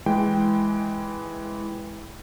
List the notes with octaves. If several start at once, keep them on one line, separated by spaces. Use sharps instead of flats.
E3 G#3 G5